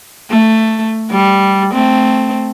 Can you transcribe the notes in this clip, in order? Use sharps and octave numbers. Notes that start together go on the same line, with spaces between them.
A3
G3
A3 C4